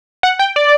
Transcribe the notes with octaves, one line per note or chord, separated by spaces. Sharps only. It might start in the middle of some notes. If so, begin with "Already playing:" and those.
F#5
G5
D5